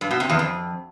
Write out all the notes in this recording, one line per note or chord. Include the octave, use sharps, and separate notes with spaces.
G2
B2
C3
E2
F2